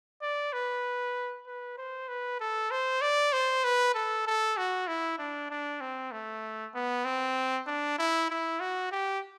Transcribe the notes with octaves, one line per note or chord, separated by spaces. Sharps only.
D5
B4
B4
C5
B4
A4
C5
D5
C5
B4
A4
A4
F#4
E4
D4
D4
C4
A3
B3
C4
D4
E4
E4
F#4
G4